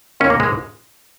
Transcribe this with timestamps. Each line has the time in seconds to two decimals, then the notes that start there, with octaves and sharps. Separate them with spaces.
0.20 D#2 C#3 G#3 C#4
0.30 A#3
0.40 G#3